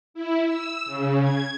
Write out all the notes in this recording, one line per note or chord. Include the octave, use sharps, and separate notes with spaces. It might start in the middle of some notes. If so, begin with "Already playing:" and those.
E4
E6
C#3
G#6